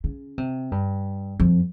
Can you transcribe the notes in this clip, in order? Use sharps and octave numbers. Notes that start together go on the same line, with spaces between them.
C#3
C3
G2
F2